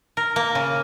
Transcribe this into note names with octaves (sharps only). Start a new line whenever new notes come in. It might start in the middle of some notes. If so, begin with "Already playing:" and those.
A#4
A#3
C#3